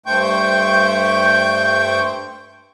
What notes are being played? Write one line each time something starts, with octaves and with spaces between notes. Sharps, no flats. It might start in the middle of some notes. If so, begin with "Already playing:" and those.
G2 A3 C5 G5 C#6 G6